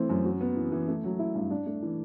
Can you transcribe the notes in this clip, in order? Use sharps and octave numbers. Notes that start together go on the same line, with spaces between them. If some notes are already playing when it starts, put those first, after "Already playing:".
Already playing: E3 A3 C4
F#2
F#4
B3
E3
E3
A3
F#3
E4
G2
D4
A3
E3